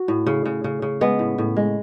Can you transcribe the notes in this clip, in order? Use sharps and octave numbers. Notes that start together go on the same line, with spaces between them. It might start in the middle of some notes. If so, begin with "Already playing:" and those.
Already playing: F#4
A2
C#3
C#3
C#3
C#3
G#3 B3
A2
A2
G#3